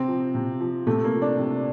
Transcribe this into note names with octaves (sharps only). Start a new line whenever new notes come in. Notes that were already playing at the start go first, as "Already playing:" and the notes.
Already playing: C3 C4
F3
C3
F3
C3 A3
A#3
F3
D4
C3